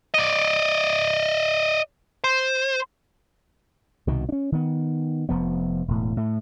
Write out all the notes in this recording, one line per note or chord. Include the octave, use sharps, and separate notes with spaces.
D5 D#5
C5
C2 B2 D#3
C#4 D4
D#3 B3
F1 F3 B3
E1 A2
A2 A3